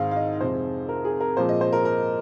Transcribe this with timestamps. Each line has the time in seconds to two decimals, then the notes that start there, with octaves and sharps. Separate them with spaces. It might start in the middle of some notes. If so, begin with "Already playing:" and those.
Already playing: G#2 D#3 G#3 C4 F5
0.11 F5
0.16 D#5
0.41 F2 C3 G#3 C5
0.89 A#4
1.05 G#4
1.21 A#4
1.37 A#2 F3 G#3 C4 C5
1.49 D#5
1.61 C5
1.73 A#4
1.85 A#4